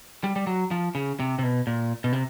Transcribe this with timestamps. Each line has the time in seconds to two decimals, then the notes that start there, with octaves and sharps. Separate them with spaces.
0.24 G3
0.36 G3
0.47 F#3
0.71 F3
0.95 C#3
1.20 C3
1.39 C3
1.43 B2
1.67 A#2
2.04 B2
2.13 C3